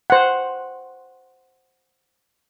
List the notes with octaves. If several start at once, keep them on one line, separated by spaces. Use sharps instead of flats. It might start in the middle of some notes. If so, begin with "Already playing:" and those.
C5 F#5